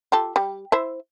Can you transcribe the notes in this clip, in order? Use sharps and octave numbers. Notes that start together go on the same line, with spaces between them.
F4 G4 A4
G3
E4 C5 E5